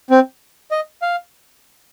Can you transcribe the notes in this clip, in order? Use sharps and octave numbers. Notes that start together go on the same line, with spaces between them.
C4
D#5
F5